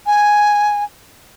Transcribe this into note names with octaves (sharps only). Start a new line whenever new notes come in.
G#5